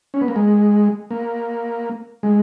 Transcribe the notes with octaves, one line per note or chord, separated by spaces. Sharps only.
C#4
B3
A#3
G#3
A#3
G#3